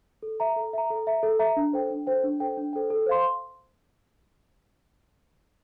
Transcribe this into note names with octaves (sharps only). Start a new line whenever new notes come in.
A4
E5 A#5
A4
E5 A#5
A4
E5 A#5
A4
E5 A#5
D4
A4 C5 G5
D4
A4 C5 G5
D4
A4 C5 G5
D4
A4 C5 G5
A4
C5 F5 C6